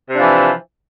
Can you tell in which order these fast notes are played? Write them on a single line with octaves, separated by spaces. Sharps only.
C3 D4 F3 E3